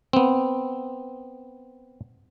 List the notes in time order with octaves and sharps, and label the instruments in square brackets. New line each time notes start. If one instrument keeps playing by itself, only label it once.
[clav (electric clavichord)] B3 C4